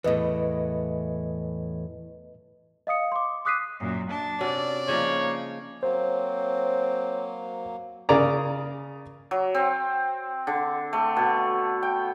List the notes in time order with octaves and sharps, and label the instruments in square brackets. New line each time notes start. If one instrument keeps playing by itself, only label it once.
[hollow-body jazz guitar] E2 A2 [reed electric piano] B4 D#5
[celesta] D#5 F5 D#6 C#7
C6 D6
D6 D#6 F#6 B6 C7 D#7
[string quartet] F#2 A#2
D4 A5
[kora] C3 C#4 F#4 [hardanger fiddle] D5
[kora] C#3 F3 G#3 [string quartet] A#3 D#4 [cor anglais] C#5
[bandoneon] F#3 A#3 [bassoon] C4 [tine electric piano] C5 [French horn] C#5
[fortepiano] C#3 G#4 A#4 D5 A#5
[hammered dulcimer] F#3
C4
D3
A3
B2
G5